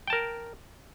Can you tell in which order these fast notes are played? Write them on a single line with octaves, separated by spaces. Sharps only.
G5 A5 A#4